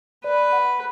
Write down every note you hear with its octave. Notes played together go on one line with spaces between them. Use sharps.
B4 D5
F#5